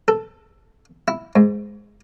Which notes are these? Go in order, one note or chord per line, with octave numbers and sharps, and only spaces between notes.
A4
E4
G#2